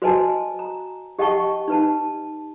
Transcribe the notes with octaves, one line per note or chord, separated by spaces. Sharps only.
F#4 B4 C5 D#5 G#5 A5
A#5
G4 D#5 F#5 G5 A5 C#6
D#4 B4 A5